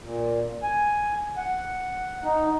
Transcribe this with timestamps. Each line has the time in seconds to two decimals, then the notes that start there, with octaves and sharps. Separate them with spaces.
0.03 A#2
0.63 G#5
1.37 F#5
2.24 D#4